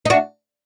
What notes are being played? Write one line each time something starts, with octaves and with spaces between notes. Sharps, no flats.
D#4
D4 F#4